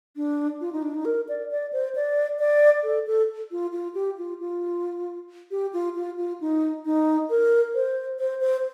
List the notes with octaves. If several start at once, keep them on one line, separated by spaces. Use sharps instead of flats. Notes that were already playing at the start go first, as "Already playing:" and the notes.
D4
F4
D#4
D4
D#4
A#4
D5
D5
C5
D5
D5
A4
A4
F4
F4
G4
F4
F4
G4
F4
F4
F4
D#4
D#4
A#4
C5
C5
C5